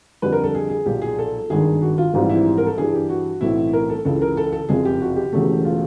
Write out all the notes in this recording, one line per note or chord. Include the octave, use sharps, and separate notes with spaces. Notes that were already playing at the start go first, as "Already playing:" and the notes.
F2 D3 G3 B4
A#4
A4
G#4
G#4
B1 A#2 F3 G4
G#4
A4
G#1 G2 D#3 G#4
F#4
F4
A#1 G#2 E3 G3 C4 F4
E4
A#4
A4
G2 E3 G3 G#4
G4
F#4
B1 A2 E3 A3 C4 E4
A#4
A4
C#2 C#3 E3 A4
A#4
A4
A4
F#1 F2 C3 F3 G#4
G4
F#4
G4
E1 E2 C#3 F#3 A3
F4